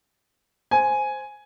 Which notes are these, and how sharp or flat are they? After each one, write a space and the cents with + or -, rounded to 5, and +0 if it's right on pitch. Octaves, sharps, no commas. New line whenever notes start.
C5 +0 G#5 +5